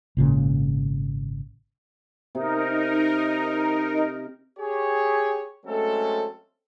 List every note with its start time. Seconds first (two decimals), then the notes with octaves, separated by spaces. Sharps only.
0.17 G#1 A#2 C#3
2.35 C3 D#4 A#4
4.59 G4 G#4 C#5
5.66 F#3 G#3 A3 C4 C#4 A4